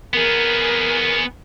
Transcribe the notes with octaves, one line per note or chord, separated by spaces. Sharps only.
B3 G#4 A#4